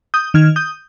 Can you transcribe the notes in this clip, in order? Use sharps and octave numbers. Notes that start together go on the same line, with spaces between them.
D#6 G6
D#3 F6 G#6
D#6 G6